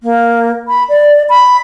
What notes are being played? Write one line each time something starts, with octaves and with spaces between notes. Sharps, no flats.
A#3
B5
D5
B5